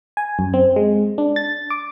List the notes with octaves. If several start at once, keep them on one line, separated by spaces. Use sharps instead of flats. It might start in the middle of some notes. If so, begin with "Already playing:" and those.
G#5
F#2
C4
G#3
D4
A6
D6